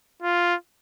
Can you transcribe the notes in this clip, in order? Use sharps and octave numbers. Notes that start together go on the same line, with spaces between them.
F4